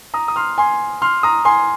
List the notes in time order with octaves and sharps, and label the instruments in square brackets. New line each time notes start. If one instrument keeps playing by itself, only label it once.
[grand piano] A#5 D#6
D#6
C6 F6
G#5 C6
C6 F6
A#5 D#6
G#5 C6